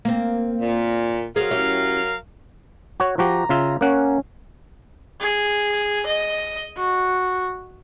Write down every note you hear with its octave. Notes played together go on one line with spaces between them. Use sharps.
A#3 C4
A#2
F#3 G#4 A#4 C5 F5
C#4 E4 G4
F#4 C#5
F3 F#4 G4 A#5
C#3 F4 E5
A#3 C#4 F#5
G#4
D#5
F#4